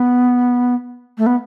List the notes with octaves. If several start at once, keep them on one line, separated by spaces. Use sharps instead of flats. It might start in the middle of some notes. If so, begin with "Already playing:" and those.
Already playing: B3
A3
B3